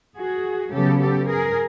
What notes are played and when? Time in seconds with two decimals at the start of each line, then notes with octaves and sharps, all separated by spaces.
0.17 F#4 G#4
0.72 C#3 F#3 B3 G4 A4
1.01 G4 A4
1.28 G#4 A#4